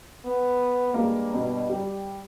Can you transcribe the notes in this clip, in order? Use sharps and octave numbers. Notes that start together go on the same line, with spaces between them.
B3
G2 G#3 A#3
B2
G3 G4